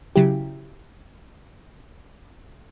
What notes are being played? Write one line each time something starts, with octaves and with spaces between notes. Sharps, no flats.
C#3 F#3 E4 G4